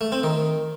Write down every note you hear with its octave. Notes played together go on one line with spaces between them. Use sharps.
A3
C4
D#3